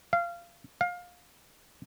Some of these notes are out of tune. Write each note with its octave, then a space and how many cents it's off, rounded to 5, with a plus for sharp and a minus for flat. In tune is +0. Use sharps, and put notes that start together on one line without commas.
F5 -20
F5 +25